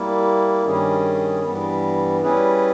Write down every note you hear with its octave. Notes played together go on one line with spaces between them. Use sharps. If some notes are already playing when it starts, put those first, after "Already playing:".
Already playing: G3 A#3 E4
G2 D#3 G3 C#4 G#4
G2 E3 G3 B3
G3 C#4 E4 G#4 B4